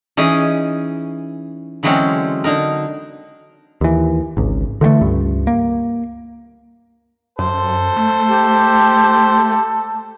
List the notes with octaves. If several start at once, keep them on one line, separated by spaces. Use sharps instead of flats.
E3 C#4 D#4 G#4 D#5
D3 E3 F#3 G#3 C4 C#4
D3 D#4 A#4
D#2 E3
G#1 C#2
D3 E3 G3 A3
C#2 G2
A#3
F#2 A4 C5
A3
G4